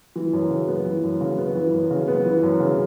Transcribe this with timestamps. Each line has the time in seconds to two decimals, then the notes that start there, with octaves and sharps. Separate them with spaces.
0.16 E3
0.33 F#2
0.50 C#3
0.68 B3
0.86 E3
1.03 F#2
1.21 C#3
1.38 B3
1.55 E3
1.73 F#2
1.91 C#3
2.08 B3
2.26 E3
2.43 F#2
2.60 C#3